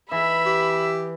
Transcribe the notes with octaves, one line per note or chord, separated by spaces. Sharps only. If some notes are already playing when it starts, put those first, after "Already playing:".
E3 E5 B5
G4